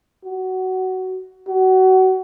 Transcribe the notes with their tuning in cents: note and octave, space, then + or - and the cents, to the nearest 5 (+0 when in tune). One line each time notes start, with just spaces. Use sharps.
F#4 +15
F#4 +25